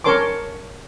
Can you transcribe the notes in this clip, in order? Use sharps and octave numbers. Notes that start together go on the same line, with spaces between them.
C#4 A#4 C#5 A5 C6 D6